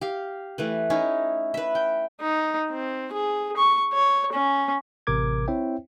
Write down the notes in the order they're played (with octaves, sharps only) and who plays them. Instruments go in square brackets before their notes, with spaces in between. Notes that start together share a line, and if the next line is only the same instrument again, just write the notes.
[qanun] G4 F5
E3 A3 B4
C#4 D#4 E4
B4 E5
G5
[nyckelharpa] D#4
C4
G#4
C#6
C#5
C#4
[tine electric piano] A1 C3 A#4 D6 G#6
C4 E4 C5 C#5 E5 G5